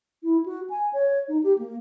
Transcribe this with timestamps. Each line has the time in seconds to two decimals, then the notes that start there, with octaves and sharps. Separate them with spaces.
0.23 E4
0.46 F#4
0.70 G#5
0.93 C#5
1.28 D#4
1.44 G4
1.58 A#3